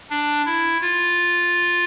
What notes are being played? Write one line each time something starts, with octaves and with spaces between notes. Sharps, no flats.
D4
E4
F4